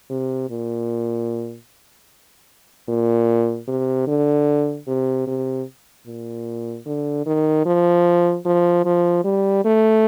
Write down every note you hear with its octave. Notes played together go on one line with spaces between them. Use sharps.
C3
A#2
A#2
C3
D3
C3
C3
A#2
D3
D#3
F3
F3
F3
G3
A3